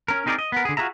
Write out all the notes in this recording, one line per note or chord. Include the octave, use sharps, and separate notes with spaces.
C#4 A#4
C4 D#4 G#4 A#4 D5
D#5
B3 A#4
D3 G#4
F4 F#4 G#4 E5 A#5